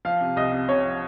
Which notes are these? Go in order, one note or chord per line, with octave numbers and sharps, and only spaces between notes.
F3 F5
C3
C2 D#5
C3
C3 C#5
F3